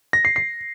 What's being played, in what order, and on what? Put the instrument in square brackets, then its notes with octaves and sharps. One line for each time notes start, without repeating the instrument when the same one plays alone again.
[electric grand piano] A#6
C7
C7